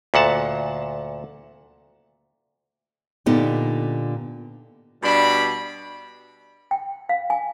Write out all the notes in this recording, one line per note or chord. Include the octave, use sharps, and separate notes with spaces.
D2 A#2 F#5 A5
A#2 D3 B3 D#4 G4
B2 G3 D4 B5
G5
F5
G#5